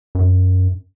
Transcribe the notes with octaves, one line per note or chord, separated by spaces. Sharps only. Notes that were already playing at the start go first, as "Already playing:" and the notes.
F#2